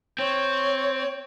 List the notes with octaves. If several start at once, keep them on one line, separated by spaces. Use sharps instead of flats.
C4 C#5